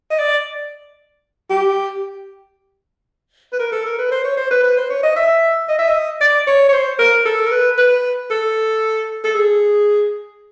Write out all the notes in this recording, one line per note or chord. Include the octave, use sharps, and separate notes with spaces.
D#5
D5
G4
B4
A#4
A4
A#4
B4
C5
C#5
C5
B4
B4
C5
C#5
D#5
E5
D#5
E5
D#5
D5
C#5
C#5
C5
A#4
A4
A#4
B4
B4
A4
A4
G#4